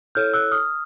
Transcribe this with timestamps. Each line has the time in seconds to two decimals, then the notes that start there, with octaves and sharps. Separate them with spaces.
0.15 E4 A4 C#5 F6 G6
0.34 E6 F#6
0.51 D#6 F6